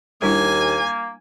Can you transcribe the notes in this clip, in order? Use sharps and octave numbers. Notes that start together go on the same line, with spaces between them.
D#2 G3 A#3 D4 E4 G#5